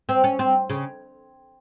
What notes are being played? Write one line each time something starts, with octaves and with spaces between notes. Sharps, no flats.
C4
C#4
C4
C#3